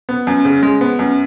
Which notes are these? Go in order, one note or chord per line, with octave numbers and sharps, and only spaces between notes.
B3
F#2
C#3
G#3
B3
F#2